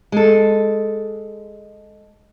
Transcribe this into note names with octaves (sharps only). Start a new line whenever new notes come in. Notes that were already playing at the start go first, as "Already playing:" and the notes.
G#3 A4